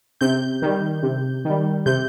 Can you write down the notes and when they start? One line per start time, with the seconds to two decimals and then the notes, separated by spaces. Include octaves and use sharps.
0.21 C3 G6
0.62 D#3 G3
1.03 C3
1.45 D#3 G3
1.86 C3 G6